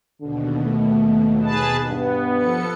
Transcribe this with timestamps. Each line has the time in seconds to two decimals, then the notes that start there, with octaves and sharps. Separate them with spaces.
0.21 D#2 B2 D3
0.64 A3
1.43 G#4 B4 A5
1.89 G2 B3
2.36 F3 A4 C#7